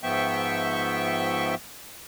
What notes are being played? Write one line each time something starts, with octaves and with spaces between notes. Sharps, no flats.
G#2 F3 B3 E5 G5 C#6